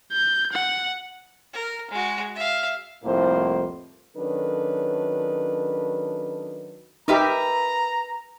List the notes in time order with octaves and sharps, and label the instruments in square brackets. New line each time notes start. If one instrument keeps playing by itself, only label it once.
[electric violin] G6
F#5
[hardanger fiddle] A#4
G#3 F#4
E5 F5
[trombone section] C2 F2 A2 A#3 C5
[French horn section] D#3 F#3 C#4 D4 A4 B4
[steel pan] D#4 G4 [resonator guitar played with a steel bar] A#4 B4 E5 [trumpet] A#5